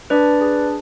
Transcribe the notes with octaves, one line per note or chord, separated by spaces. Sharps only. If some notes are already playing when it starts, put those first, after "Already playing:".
D4 B4 D5
G#4